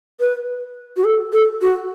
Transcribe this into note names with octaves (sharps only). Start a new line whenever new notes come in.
B4
F#4
A4
A4
F#4